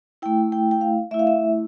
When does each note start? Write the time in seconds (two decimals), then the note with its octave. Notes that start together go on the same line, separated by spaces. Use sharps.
0.22 A3 E4 G5
0.52 G5
0.71 G5
0.81 F5
1.11 A3 E5
1.14 E4
1.19 F5
1.27 E5